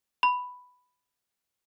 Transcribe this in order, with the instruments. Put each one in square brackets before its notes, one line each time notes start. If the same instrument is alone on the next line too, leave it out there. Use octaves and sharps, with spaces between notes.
[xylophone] B5